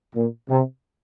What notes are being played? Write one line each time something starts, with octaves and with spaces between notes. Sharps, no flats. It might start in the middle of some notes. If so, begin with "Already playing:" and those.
A#2
C3